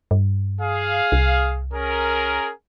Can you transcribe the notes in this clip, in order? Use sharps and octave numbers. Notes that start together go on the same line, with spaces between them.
G2
G#4 F5
C2
C#4 G#4 A#4